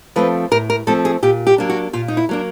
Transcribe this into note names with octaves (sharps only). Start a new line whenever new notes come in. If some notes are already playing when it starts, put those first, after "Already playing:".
F3 A3 C4 B4
A2 A#4
A#4
F3 A3 C4 A4
G#4
A#2 G4
G4
F#3 A#3 D4
F#4
A#2 F4
D#4
E4
F#3 A#3 D4